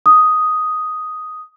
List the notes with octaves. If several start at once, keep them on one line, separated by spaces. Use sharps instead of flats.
D#6